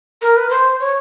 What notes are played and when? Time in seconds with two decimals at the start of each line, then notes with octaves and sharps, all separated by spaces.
0.22 A#4
0.37 B4
0.50 C5
0.80 C#5